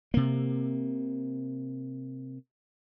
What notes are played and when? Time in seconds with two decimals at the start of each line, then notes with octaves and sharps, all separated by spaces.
0.14 C3 A#3